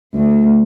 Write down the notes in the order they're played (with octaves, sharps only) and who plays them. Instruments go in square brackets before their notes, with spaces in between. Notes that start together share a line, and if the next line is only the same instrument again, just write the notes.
[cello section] D2